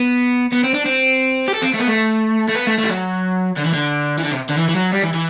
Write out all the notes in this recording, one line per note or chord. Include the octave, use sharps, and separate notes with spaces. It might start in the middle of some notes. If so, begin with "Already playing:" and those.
Already playing: B3
B3
C4
D4
C4
G4
A4
C4
A3
B3
A3
A3
B3
A3
A3
E3
F#3
D3
E3
D3
E3
D3
C3
D3
E3
E3
F#3
G3
E3
E3